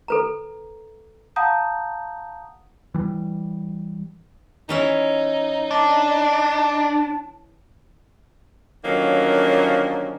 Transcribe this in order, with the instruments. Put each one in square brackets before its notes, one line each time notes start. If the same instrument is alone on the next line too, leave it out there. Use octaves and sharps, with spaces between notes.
[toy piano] A4 B4 A#5
[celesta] F5 F#5 A5 A#5 D#6 G6
[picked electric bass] E3 G3
[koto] E3 C#4 E4 [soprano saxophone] D#4
[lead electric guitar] D4 [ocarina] A5
[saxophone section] D3 D#3 F3 F#3 A#3 C#4